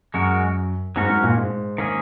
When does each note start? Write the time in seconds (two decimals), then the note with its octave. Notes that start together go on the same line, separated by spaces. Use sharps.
0.14 F#2 G#3 F#4 A#4
0.96 G#2 F#3 C#4 F#4 A#4
1.09 G#2
1.24 A#2
1.37 G#2
1.78 D#3 A#3 C#4 G#4